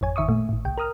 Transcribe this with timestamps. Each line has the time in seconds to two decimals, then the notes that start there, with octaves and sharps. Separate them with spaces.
0.01 G#1 F2 C#5 G#5
0.16 G#1 D#3 E5 C#6 D#6
0.28 A#2 A3
0.49 G#1 A2
0.65 C2 G5
0.78 A#4 A#5 D#6 F6